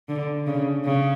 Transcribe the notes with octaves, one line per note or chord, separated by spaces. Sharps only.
D3
C#3
C#3